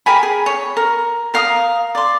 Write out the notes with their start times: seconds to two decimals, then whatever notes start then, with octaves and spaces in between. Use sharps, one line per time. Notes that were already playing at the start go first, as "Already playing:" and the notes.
0.06 G4 A#4 G#5 B5
0.23 G#4
0.46 C#5
0.77 A#4
1.34 A#4 F5 A#5 D#6
1.95 D5 C6